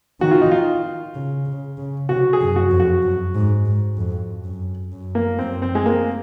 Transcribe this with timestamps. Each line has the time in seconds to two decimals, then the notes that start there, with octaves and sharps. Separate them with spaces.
0.21 D#3 F#4
0.31 F4
0.42 D#4
0.51 F4
1.15 C#3
1.46 C#3
1.78 C#3
2.09 C3 F#4
2.33 G#4
2.41 F#2
2.56 F#4
2.71 F2
2.80 F#4
3.03 F#2
3.35 G#2
3.65 G#2
3.97 F2
4.44 F#2
4.92 F#2
5.15 A#3
5.39 F#2 C4
5.62 C4
5.75 G#3
5.86 A#3